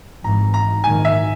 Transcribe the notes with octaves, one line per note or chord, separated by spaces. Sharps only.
G#1 G#2 E3 A#5
A#5
A#1 G#2 D#3 G#5
E5